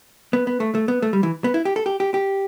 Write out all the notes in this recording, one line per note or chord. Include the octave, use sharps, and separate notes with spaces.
B3
B3
A3
A3
B3
A3
G3
E3
B3
E4
G4
A4
G4
G4
G4